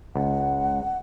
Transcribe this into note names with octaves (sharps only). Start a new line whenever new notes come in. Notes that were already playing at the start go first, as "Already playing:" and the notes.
C#2 F#5